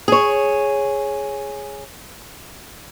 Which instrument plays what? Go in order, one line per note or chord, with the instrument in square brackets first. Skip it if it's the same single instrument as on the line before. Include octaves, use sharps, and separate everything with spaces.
[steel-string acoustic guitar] G#4 C#5